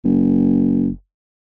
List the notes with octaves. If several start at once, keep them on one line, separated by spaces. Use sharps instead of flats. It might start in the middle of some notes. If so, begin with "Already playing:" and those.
F#1